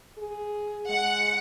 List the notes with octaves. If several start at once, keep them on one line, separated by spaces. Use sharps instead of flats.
G#4
G#3 F#5